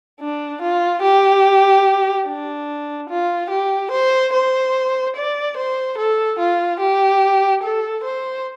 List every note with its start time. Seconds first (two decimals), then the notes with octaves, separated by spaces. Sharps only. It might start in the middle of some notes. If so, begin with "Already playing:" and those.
0.21 D4
0.62 F4
1.02 G4
2.26 D4
3.10 F4
3.50 G4
3.91 C5
4.33 C5
5.16 D5
5.57 C5
5.98 A4
6.39 F4
6.80 G4
7.63 A4
8.04 C5